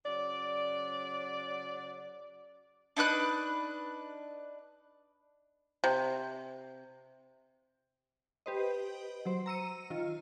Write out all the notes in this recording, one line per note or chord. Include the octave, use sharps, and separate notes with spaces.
C#3 F#3 D5
D4 D#4 B4 F#6
C3
G4 B4 C5 D#5
F#3 C5
A#5 E6 C#7 D#7
D#3 F4